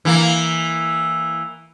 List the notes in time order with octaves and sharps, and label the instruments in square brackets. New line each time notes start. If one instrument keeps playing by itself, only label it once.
[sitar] E3 A#3